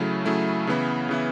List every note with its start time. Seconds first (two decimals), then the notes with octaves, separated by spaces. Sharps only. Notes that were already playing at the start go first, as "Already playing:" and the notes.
Already playing: C#3 F#3 A3 E4
0.25 C#3 F#3 A3 E4
0.67 C#3 E3 B3 E4
1.09 C#3 E3 B3 E4